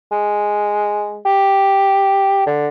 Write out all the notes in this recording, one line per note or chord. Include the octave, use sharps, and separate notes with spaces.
G#3
G4
D3